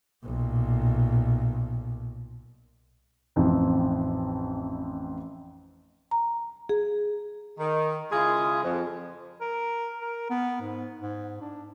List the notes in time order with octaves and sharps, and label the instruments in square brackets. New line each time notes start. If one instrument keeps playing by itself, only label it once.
[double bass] B1 A#2
[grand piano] A1 F2 C4 D#4
[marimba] A#5
G#4
[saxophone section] D#3
C#3 G#3 E4 F4 G#4
F2
[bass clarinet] A#4
A#4
B3
G#2
G#2
D4